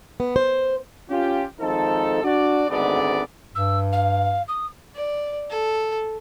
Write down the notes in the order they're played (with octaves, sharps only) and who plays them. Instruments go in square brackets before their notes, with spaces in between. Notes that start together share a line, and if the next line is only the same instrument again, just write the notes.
[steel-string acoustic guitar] B3
C5
[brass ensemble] C#4 F4 G4
G#1 F3 D#4 A4
D4 F#4 D5
G#1 D2 G#2 D3 B3 D5
[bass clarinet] G2 [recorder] E6
[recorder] F5
D#6
[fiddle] D5
A4